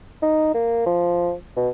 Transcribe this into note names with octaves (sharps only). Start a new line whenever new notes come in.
D#4
A#3
F3
B2